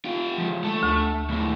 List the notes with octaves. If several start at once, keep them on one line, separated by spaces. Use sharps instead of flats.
F4 G4
F3 G#3
A3 A5
D2
D#2 G#2 A3 E4